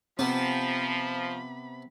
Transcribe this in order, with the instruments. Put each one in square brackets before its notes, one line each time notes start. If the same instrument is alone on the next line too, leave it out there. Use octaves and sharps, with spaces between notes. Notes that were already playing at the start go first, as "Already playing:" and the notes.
[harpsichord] C3 B3 [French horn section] F3 [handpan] C4 [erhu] B5